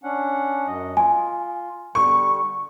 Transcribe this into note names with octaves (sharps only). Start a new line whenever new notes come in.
C#4 D4 F#5
F#2 F#3 D#5
F4 G#5
D3 G3 C#6